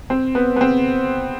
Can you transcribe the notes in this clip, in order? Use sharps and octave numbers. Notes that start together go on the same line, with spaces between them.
C4
B3
B3
C4